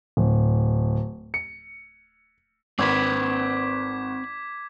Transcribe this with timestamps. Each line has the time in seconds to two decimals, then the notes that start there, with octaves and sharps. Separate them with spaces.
0.17 D1
1.34 C#7
2.79 G#1 C4 B4 D6 G#6 B6